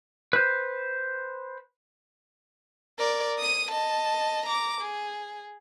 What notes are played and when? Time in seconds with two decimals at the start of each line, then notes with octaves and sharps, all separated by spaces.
0.33 B4 C5
2.98 A#4 D5
3.38 D#6 D#7
3.71 D#5 A5
4.46 A#5 D6
4.81 G#4